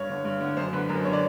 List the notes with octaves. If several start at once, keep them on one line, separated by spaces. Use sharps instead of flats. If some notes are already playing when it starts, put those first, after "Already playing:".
Already playing: G2 C#5
D3
G2
D3
F#2 C5
D3 B4
F#2 A#4
C5
D3 C#5
D5